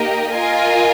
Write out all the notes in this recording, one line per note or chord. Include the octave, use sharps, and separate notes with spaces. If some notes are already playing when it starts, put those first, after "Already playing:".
Already playing: A#3 D#4 G4 A#4 D#5
F4 A#4 D#5 G#5